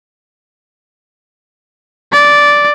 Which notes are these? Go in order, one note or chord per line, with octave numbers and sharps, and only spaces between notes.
D5